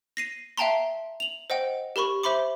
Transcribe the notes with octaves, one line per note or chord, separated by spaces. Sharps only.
A#6 C7 D#7
E5 F5 G5 A5 A#5 C6
F7 F#7
C5 D#5 F#5 G5
G4 A#4 B5 C#6
C5 E5 B5 C6 D6